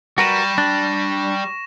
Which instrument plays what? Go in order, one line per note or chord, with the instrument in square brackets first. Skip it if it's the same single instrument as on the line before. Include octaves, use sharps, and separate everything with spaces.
[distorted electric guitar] G3 [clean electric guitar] F#4 A#4 B4 [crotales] C#6 A#6 E7
[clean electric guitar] D4